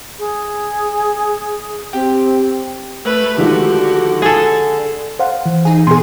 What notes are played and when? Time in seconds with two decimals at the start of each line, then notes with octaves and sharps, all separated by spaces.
0.19 G#4
1.93 C4 G4
3.05 A3 B4
3.38 D3 D#3 F3 G#3 F#4 G4
4.22 G#4 A4
5.19 C5 F5 F#5
5.46 E3
5.65 D#4 G#4
5.87 B2 G#4 C6